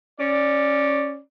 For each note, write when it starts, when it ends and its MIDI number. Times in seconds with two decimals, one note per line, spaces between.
0.20 1.19 61
0.20 1.19 74